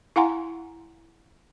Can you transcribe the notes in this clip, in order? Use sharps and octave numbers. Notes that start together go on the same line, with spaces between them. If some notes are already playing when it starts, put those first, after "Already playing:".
E4 F5 F#5 G#5 A#5 C6